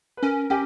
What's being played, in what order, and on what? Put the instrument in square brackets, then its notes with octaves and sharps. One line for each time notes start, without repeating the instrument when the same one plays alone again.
[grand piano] B4
[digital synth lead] C#4 [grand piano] A#4
[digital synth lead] C#4 [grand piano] G4